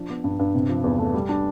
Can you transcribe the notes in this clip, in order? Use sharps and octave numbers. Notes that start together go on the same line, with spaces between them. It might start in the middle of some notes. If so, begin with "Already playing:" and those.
Already playing: F3 D4
B3
G2
G2
C3
F3
E2
A3
G3
D4